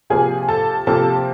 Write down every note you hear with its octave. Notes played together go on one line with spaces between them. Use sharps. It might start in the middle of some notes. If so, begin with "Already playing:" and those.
C3 F3 A#3 G#4 G#5
A4 A5
C3 F3 A#3 A4 A5